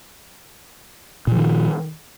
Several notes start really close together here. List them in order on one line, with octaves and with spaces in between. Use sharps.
A#2 F3 D#3